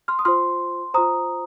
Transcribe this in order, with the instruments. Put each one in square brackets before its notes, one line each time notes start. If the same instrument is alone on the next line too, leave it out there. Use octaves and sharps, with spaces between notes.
[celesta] C6 F6
D#6
F4 C5 C6 F6
F4 C5 A#5 D#6